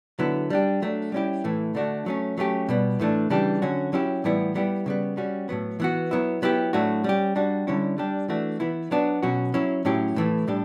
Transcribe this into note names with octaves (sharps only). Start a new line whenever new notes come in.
D3 F#3 B3 E4
G3 D4 G4
F#3 A3 D4
G3 C#4 E4 G4
A2 E3 A3
D3 A3 D4 F#4
F#3 A3 C#4
F#3 A3 C#4 G4
B2 G3 B3
A2 E3 A3 D4
C#3 E3 G3 D4 G4
D3 F#3 C#4 F#4
F#3 C#4 E4 G4
A2 E3 G3 B3 E4
G3 B3 E4 G4
C#3 G3 B3
G3 C#4 F#4
A2 F#3 B3
E3 B3 F#4
F#3 B3 E4
F#3 B3 E4 G4
A2 F#3 A3 D4 F#4
G3 C#4 G4
G3 D4 F#4
D3 G3 C#4 E4
G3 D4 G4
E3 A3 D4 F#4
E3 B3 E4
F#3 B3 D4 F#4
B2 F#3 C#4 F#4
F#3 C#4 E4
A2 F#3 C#4 E4 G4
A2 E3 A3
A2 G3 D4 G4